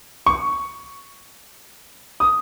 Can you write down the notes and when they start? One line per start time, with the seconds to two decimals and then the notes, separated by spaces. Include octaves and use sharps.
0.26 C#6
2.20 D#6